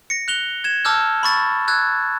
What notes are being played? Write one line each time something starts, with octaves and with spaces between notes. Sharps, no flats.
A#6 C#7
F#6 F7 G7
G#6 E7
A5 D6 E6 F6 G6
B5 C#6 A6
E6 F#6 G#6